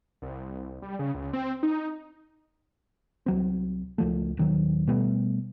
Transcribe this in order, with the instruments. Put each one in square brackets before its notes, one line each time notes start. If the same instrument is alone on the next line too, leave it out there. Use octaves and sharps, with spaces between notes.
[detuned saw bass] C2
G3
C#3
C#2
C4
D#4
[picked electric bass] C2 F#3 C4
C#2 F3 A3
D#1 D#3 F#3
B2 G3 A3 B3